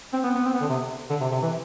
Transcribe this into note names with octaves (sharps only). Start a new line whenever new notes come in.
C4
B3
B3
C4
B3
D3
C3
D3
C3
C3
E3